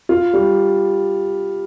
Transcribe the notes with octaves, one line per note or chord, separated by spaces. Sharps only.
F4
G3